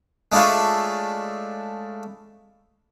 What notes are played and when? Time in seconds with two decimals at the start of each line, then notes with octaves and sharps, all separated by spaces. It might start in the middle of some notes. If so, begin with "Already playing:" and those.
0.32 G#3 A3 D4 E4 F4 C#5